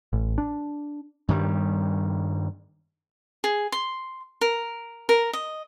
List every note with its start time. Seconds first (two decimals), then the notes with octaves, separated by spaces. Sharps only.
0.13 A1
0.38 D4
1.29 G2 D#3 G3
3.44 G#4
3.72 C6
4.41 A#4
5.09 A#4
5.33 D#5